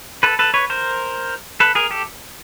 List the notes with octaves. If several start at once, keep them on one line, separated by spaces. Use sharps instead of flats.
A4 B4
A4 B4
B4 C#5
A#4 C5
A4 B4
G#4 A#4
G4 A4